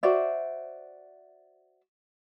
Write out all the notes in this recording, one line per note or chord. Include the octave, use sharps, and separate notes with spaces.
F#4 C5 D5 E5